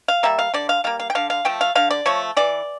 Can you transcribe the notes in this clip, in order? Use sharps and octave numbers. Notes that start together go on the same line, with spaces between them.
F5
G3 A#3 E5
F5
D3 D5
F5
G3 A#3 F5
F5
G5
D3 F5
F5
F3 A3 G5
F5
D3 F5
D5
F3 A3 C#5
E3 D5